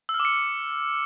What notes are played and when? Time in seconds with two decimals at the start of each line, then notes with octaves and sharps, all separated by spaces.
0.09 E6
0.14 F6
0.20 D6
0.25 C#7